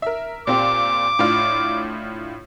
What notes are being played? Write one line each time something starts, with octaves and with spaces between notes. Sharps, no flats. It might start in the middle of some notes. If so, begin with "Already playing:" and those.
A#4 E5
A#2 C4 G4 D6
A2 D4 F4